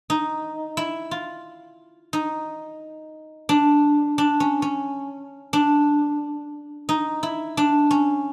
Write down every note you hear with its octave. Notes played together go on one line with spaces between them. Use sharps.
D#4
E4
F4
D#4
D4
D4
C#4
C#4
D4
D#4
E4
D4
C#4